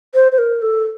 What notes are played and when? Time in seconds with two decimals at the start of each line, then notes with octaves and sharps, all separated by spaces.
0.14 C5
0.32 C5
0.38 A#4
0.62 A4